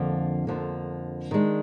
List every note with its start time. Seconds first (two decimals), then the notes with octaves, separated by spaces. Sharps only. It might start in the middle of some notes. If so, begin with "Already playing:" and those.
Already playing: F2 D3 F3 A#3
0.47 F2 D3 F3 A#3
1.31 D#3 G#3 D4